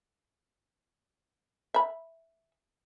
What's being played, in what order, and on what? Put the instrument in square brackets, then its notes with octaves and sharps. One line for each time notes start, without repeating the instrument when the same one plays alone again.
[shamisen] E5 B5